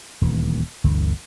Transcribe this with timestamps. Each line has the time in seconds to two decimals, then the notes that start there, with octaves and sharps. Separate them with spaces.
0.21 D#1 D2 D3 E3
0.84 G1 D2 D3 E3